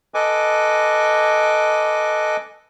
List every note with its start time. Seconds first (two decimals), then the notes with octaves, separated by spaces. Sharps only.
0.14 A4 B4 D#5 G#5 D6